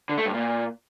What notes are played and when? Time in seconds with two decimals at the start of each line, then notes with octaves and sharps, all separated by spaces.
0.09 D3
0.18 A3
0.26 G2
0.34 A#2